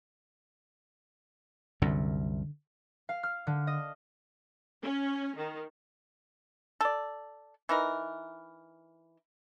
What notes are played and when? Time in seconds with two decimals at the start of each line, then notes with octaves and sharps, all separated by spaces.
1.82 C2 F#2 D3
3.09 F5
3.23 F6
3.47 D3
3.67 D#5
4.83 C#4
5.37 D#3
6.81 A4 D5
7.69 E3 D#4 E4 A#4